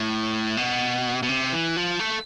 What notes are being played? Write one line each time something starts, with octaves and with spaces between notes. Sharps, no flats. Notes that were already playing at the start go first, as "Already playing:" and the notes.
Already playing: A2
B2
B2
C3
E3
F3
A3